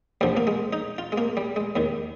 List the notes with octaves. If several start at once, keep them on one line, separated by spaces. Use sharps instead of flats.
D2 D3 F3 G3
A#3
G#3
D#4
F4
G#3
A#3
G3
G#3
D#2 D#3